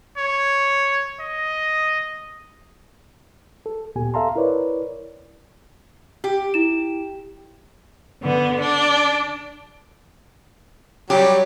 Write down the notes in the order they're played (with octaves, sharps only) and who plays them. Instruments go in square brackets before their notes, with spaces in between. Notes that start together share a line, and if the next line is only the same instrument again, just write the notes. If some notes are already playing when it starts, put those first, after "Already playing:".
[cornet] C#5
D#5
[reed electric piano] A4
D2 A#2 B3 G4 G#5
A4 E5 F5 A5 A#5 C6
E4 A#4 B4 C#5 D5
[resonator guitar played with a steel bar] G4
[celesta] E4 E7
[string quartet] D3 B3
D4
[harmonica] F#3 G3 [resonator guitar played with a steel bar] G4 [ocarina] C#5